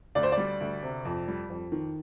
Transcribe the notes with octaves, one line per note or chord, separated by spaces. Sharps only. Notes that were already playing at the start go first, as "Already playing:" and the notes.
D2 D5
C5
D5
G3
D2
C3
F2
G3
F2
D#3